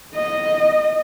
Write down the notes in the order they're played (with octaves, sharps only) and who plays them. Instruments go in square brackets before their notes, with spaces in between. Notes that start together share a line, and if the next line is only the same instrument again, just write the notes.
[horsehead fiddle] D#5